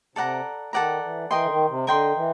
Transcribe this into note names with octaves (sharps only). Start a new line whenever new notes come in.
C3 A4 D5 F#5 A#5
D#3 A4 D5 F#5 A#5
E3
E3 A#4 D#5 G5 C6
D3
D#3
C3
D3 A#4 D#5 G5 C6
E3